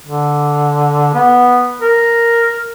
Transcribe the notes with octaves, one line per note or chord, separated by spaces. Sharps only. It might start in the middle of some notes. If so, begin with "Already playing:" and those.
D3
B3
A#4